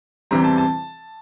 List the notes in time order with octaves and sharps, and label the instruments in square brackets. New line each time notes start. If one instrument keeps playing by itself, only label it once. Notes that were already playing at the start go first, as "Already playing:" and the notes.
[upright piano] E2 C3 E3 G3 C4 A#5
A5
A5